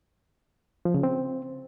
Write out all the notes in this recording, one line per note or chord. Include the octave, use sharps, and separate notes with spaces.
F3
C#3
C4